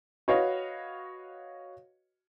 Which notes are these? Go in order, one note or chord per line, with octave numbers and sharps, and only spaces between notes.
F#4 B4 C#5 D#5 F5